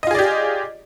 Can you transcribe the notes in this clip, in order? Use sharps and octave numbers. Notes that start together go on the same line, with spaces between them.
F4 G4 G#4 D5 D#5